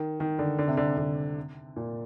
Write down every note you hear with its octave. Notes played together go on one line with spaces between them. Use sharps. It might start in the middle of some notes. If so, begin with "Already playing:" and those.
Already playing: D#3
D#3
D3
D3
C3
D3
D3
A#2